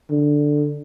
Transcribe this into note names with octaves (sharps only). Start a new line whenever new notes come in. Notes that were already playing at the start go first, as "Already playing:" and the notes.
D3